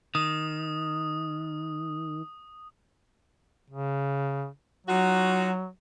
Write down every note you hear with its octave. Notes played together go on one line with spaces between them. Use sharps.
D#3 D#6
C#3
F#3 D#4 F4 F#4